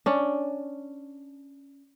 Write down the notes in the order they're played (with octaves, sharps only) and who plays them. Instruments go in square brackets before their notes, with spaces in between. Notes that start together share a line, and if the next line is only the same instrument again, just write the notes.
[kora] C#4 D4